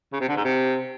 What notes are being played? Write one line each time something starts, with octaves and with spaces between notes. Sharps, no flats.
C#3
C3
D3
G#2
C3